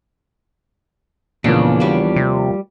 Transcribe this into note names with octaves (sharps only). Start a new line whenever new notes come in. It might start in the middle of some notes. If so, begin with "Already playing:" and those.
D#2 A#2 C#3 E3 F3 A#3 B3 D4
G3 F#4
C3